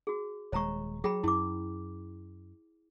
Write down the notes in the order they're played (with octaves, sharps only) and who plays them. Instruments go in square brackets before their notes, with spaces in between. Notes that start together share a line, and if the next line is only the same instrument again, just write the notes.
[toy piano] F#4 G#4
[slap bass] D#1 G#3 [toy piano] C#5 A#5 C#6
[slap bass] F#3 [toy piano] G#4 G5 B5
[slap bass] F#2 [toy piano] E4 D6